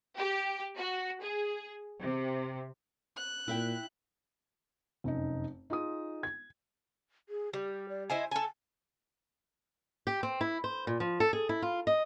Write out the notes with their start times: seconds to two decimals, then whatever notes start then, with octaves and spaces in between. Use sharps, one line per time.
0.17 G4
0.77 F#4
1.22 G#4
2.02 C3
3.17 F#6
3.48 A#2 E4 E5 G5
5.04 F1 F#2 D#4
5.70 D#4 F4 G#4 D#6
6.23 G#6
7.29 G#4
7.53 G3 G4
7.89 D5
8.10 E4 C5 D#5 G#5
8.31 A4 G#5 A5
10.07 G4
10.23 C4
10.41 E4
10.64 C5
10.87 A#2
11.00 F3
11.20 A4
11.33 G#4
11.49 E4
11.62 F4
11.87 D#5